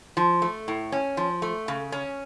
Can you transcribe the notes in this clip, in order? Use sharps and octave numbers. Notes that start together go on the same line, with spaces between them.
F3
A3
A2
C#4
F3
A3
C#3
C#4